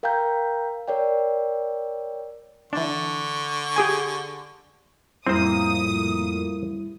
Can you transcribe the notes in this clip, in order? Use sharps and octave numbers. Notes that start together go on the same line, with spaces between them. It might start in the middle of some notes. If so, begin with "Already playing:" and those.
A#4 F5 G5 A#5 G6
A#4 C#5 D5 G5
D3 E3 D4 C#6
G4 G#4 G#5
F2 A2 G3 A#3 C4 E4 C5 D#6